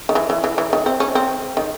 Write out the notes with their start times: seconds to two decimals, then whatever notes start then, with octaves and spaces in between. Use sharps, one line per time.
0.09 D#3
0.15 E3
0.30 E3
0.44 E3
0.58 E3
0.73 D#3
0.86 C4
1.00 C#4
1.15 C4
1.57 D#3